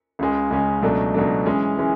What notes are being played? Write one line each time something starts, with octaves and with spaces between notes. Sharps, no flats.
C#2 C#3 G#3 C#4
C#2 C#3 G#3 C#4
C#2 B2 F#3 A3 D4
C#2 B2 F#3 A3 D4
E3 G#3 C#4
E3 G#3 C#4